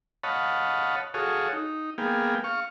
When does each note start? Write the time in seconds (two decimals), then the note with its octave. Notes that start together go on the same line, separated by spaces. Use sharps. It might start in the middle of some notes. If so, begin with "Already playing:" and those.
0.23 C#5 D#5 F5 F#5 A5 B5
1.14 F#4 G#4 A4 C#5 F5 D#6
1.53 D#4
1.98 A#3 B3 G#4 F5 G5
2.44 F5 C#6